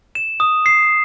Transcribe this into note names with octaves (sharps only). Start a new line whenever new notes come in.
E7
D#6
C7